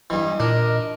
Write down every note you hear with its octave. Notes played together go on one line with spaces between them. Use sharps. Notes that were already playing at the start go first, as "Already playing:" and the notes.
G2 E3 D#5
A#2 D4 A#4